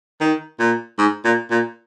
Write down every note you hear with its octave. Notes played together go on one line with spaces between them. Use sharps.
D#3
A#2
G#2
A#2
A#2